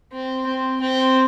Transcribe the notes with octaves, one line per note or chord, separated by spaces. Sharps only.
C4
C4
C4